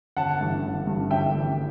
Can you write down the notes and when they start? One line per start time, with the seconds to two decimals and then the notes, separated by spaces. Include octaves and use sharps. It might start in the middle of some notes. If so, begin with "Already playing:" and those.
0.17 G1 F#5 A5
0.41 G2 E3
0.64 G1
0.87 G2 E3
1.10 G1 E5 G5
1.35 G2 E3